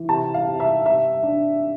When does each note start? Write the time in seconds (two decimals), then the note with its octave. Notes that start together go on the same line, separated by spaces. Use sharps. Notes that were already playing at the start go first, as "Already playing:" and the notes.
Already playing: E3
0.09 C3 A5
0.34 F5
0.47 C3
0.60 E5
0.86 C3 E5
1.23 D4